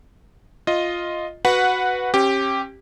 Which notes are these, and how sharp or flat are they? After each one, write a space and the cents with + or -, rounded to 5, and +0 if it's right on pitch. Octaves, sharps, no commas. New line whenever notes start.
F4 +0 D#5 +0
F#4 +0 B4 +0 F#5 -10
C#4 -35 G4 +0